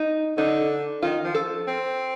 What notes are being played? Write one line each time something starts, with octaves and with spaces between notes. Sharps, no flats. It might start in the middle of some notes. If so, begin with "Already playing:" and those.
Already playing: D#4
D3 D#4
D#3 F4
F3
A4
C4